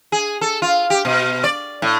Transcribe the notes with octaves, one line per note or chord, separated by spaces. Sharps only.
G#4
A4
F4
G4
B2
D5
A2